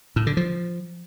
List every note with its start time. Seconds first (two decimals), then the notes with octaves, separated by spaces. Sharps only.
0.16 A2
0.27 D3
0.37 F3